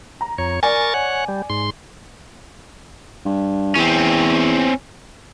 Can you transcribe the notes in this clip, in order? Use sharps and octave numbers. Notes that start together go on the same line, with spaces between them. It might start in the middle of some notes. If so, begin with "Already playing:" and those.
A#5
F2 C#5
A#4 D5 G#5 C#6 A6
C#5 F#5
G3
G#2 C6
G2
E2 C4 C#4